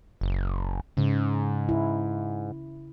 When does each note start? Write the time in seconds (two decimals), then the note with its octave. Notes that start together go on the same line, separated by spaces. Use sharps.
0.21 F#1
0.97 G#2 C#3
1.69 E4